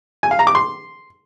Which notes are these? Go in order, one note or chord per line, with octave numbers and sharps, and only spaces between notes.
G#5
F5
A#5
D6
C6